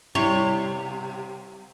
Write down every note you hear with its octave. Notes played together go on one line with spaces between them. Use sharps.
C3 G3 E4 C#5